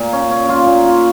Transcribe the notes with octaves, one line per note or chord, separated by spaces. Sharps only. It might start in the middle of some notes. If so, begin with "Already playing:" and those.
Already playing: A#2
C#4
C#4
F4
A#2
F4